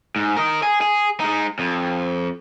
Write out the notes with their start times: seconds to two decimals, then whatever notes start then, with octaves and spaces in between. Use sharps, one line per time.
0.16 G#2
0.37 A#4 D#5
0.63 G#4
0.81 G#4
1.20 G#3 D#4
1.59 F2